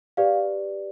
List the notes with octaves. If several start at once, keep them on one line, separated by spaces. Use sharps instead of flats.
G4 B4 D5 F5